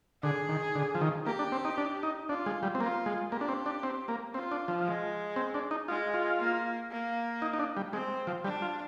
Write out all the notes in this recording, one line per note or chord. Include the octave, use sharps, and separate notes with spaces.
D3 G#4
D#3
D3
F3
D#3
A#3 G4
D4
C4
D#4
D4
D#4
D4 F4
G#3
G3
C4
A#3 F4
G#3
A#3 G4
D4
C4
D4
C4
A#3
C4 F4
D4
F3
G#3
C4
D4
D#4
G#3 F4
F4
A#3
A#3
D#4
D#4
D4
G3
G#3 C4
F3
G3 D4
F4